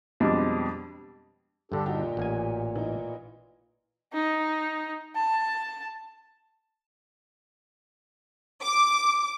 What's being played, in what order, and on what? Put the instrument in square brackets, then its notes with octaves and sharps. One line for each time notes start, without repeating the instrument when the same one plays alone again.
[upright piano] F2 B2 G3 G#3 D4
[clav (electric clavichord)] G2 D3 [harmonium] D4 G4 A4
[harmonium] A#2 [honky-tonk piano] D#4 F#4 G4
[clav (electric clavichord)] A1 A#3 G#5
[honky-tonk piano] E3 D#4
[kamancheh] D#4
A5
[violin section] D6